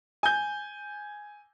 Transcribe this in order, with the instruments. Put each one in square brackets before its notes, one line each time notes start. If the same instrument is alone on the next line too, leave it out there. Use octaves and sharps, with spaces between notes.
[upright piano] G#5 G6